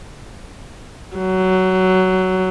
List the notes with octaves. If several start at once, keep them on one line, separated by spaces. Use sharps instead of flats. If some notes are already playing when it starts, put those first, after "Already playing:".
F#3